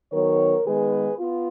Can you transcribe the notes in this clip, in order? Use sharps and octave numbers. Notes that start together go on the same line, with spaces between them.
D#3 F#3 B3 A#4 C#5
D#3 G#3 B3 G#4 B4
B3 F4